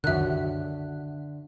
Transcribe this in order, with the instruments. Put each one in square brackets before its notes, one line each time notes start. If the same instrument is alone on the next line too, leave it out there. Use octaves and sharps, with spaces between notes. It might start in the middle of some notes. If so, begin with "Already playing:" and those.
[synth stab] C2 F#2 [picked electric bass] D3 [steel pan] D#3 F#4 [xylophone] E5 F#6